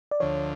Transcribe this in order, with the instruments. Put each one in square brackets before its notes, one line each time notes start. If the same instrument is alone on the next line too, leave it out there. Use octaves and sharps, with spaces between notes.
[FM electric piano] D5
[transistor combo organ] D2 D3 F3 [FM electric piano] C#5